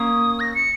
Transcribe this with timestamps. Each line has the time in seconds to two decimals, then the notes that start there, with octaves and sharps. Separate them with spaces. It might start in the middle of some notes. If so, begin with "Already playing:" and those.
Already playing: A#3 C#4 D#6
0.40 A#6
0.55 C#7